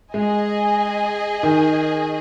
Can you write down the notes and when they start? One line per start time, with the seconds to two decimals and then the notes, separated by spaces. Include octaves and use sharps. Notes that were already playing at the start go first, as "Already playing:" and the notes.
0.14 G#3 G#4 D#5 G#5
1.43 D#3